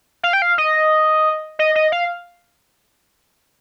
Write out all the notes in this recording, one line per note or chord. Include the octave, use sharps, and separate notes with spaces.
F5
G5
F5
D#5
D#5
D#5
F5